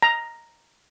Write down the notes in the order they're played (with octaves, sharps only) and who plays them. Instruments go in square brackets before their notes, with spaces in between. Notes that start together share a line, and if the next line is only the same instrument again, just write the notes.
[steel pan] A#5